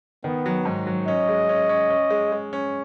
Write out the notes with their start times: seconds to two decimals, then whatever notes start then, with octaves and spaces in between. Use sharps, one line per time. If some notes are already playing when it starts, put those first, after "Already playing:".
0.24 D#3 B3
0.46 F#3
0.65 G#2
0.87 F#3
1.08 C#4 D#5
1.29 G#3
1.49 C#4
1.69 C#4
1.90 C#4
2.10 G#3
2.32 G#3
2.53 C#4